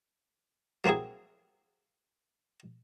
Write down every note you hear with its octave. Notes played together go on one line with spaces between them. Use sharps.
F#3 A#3 C4 E4 G#4